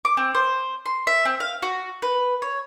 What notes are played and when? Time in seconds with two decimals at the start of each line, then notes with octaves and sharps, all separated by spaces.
0.05 D6
0.17 C4
0.35 C5
0.86 C6
1.07 E5
1.25 C4
1.40 F5
1.62 F#4
2.02 B4
2.42 C#5